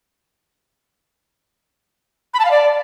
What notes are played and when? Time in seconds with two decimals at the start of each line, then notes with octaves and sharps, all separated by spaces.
2.34 B5
2.40 A5
2.45 F5
2.51 D5